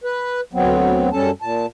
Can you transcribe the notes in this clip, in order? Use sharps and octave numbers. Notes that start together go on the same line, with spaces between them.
B4
D2 F#3 B3 C4
F#2 G3 C#4 A4 A5
A#2 A5